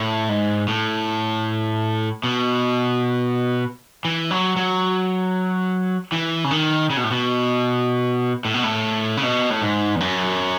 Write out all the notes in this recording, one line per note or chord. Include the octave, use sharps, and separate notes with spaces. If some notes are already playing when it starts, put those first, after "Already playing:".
Already playing: A2
G#2
A2
B2
E3
F#3
F#3
E3
C#3
D#3
C#3
B2
A2
B2
A2
B2
A2
C#3
B2
A2
G#2
E2
F#2